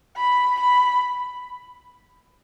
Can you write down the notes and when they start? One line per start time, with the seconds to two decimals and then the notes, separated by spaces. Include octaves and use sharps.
0.16 B5
0.59 B5